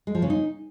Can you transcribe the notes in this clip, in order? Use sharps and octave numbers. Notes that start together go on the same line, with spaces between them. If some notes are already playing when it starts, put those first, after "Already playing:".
G#3
F3
C#3
D#4